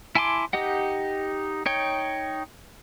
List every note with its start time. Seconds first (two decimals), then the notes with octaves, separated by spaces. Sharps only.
0.15 E4 G#5 A5 C6 D6
0.53 D#4 G4 D#5 F#5
1.66 D#4 C#5 G5